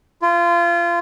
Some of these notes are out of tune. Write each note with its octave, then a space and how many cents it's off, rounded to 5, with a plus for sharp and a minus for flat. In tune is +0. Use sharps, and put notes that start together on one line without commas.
F4 -25